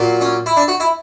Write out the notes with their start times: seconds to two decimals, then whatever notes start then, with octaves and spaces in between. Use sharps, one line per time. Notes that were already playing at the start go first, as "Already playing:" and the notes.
Already playing: A#2 F#3 A#3
0.21 C#4
0.46 E4
0.57 D4
0.68 F#4
0.80 E4